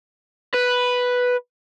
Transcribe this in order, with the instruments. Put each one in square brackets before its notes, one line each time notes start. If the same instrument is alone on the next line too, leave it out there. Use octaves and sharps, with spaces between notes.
[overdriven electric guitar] B4